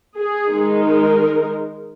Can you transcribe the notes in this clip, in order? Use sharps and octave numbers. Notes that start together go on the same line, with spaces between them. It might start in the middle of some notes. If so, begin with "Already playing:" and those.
G#4
D#3 G#3 D#4
A#4